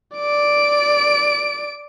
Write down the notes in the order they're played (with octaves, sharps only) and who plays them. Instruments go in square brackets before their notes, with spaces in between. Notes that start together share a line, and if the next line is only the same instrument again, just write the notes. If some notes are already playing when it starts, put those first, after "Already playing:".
[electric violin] D5 D7